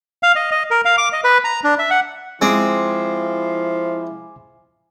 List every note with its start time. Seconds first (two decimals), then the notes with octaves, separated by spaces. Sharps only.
0.23 F5
0.36 D#5
0.51 D#5
0.71 A#4
0.85 F5
0.98 D6
1.13 D#5
1.24 B4
1.44 A#5
1.64 D4
1.79 E5
1.91 F#5
2.41 F3 G#3 C4 E4 G#5 D6